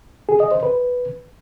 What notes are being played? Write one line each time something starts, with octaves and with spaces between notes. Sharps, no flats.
G#4
D#5
C5
B4